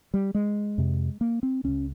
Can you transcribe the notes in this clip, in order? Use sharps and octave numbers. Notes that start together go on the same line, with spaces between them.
G3
G#3
F2 C3
A#3
C4
C#2 C#3 C#4